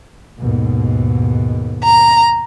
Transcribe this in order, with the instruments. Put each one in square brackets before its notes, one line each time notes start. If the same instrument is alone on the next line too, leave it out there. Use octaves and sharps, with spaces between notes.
[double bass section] D#2 G#2 B2
[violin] A#5